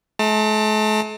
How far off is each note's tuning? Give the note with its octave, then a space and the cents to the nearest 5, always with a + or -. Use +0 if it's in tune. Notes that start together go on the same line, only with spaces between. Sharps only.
A3 -45 A5 +40